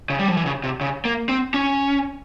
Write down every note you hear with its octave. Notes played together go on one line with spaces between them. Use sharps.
C#3
G3
F3
E3
C#3
C3
C#3
A#3
C4
C#4